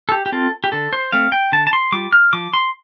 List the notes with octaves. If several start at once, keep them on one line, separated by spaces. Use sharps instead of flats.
A4
G4
G4
C4 F4 A4
G4
D3 A4
C5
A3 C4 F5
G5
D3 A5
A5
C6
G3 F4 D6
F6
F3 D6
C6